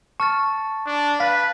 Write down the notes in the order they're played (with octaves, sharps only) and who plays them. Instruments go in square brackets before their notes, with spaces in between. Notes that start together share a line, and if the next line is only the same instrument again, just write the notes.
[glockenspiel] A5 F6 A6 [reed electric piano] C#6
[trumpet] D4
[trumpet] B4 [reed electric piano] F5 [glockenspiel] A6 B6